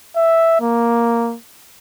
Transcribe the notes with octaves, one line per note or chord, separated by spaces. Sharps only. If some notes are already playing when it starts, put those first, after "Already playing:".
E5
A#3